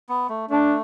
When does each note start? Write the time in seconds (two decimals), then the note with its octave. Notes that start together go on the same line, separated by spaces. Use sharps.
0.09 B3
0.29 A3
0.50 A3 D4